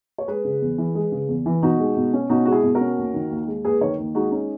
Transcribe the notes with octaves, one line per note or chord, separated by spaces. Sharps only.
C#5
G#3 G#4 B4
C#3
E2
E3
G#3
C#3
E2
E3
B2 D#4 F#4
G#3
B2
C#4
B2 D#4 F#4
G#3 F#4
E4 G#4
B2
F#4 A#4
C#4
D#2
D#3
D#2
G#3
D#2 G#4 B4
D#3 A#4 C#5
D#2
G#3 D#4 F#4
C#4 D#4